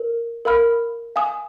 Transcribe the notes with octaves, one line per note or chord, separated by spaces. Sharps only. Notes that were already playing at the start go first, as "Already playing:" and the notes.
Already playing: A#4
A#4 F5 B5 F6
F5 G#5 D#6